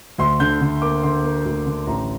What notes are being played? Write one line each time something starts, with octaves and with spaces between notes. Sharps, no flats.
D2 C6
D3 G6
D3
A#3 D6
D3 C6
A#3
D2
D3
A1 A#5